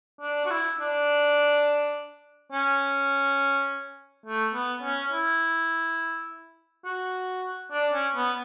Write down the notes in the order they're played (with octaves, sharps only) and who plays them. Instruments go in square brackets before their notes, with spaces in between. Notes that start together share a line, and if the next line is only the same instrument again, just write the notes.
[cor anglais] D4
F#4
E4
D4
C#4
A3
B3
C#4
E4
F#4
D4
C#4
B3